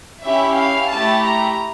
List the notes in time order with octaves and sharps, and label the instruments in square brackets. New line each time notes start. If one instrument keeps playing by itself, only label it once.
[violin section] C#4 E4 G4 E5
F5
A3 E4 G4 A5
A#5